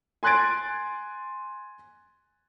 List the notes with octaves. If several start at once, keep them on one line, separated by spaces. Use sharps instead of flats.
G#5 C6 F#6 G#6 A6 D7